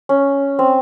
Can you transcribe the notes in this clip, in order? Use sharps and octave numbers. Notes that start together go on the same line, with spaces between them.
C#4
C4